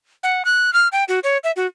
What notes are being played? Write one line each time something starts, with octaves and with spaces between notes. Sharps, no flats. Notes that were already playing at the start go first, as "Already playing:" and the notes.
F#5
F#6
F6
G5
F#4
C#5
E5
F#4